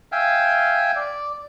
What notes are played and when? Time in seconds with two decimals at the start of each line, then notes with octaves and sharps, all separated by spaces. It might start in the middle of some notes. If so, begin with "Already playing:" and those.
0.12 E5 F5 G5 G#5
0.96 D5